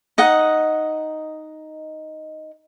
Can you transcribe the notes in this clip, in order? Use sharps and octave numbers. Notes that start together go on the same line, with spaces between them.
D#4 D#5 F#5